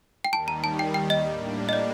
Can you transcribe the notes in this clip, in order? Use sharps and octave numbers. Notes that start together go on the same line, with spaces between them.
G5
D#2 D#3 G3 A5
A#5
A5
G5
G5
D#5
A2 G3 A#3 D4
D#5
D5